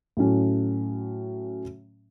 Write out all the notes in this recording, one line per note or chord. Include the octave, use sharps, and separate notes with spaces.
A2 F#3 A3 C#4